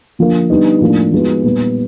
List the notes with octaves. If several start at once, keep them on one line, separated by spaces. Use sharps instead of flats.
D3 F3 A#3
D3 G3 B3 D#4
A2 F3 A#3 D4
F3 G#3 B3 D#4 F#4
A#2 G3 B3